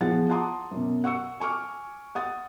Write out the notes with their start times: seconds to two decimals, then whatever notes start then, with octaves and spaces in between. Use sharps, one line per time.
0.01 E2 F3 G#4 F#5 A6
0.29 F#5 A5 A#5 C6 D6 D#6
0.71 F#2 B2
1.04 F#5 C#6 E6 C#7
1.40 G#5 C#6 D6 F6
2.15 F#5 D#6 A6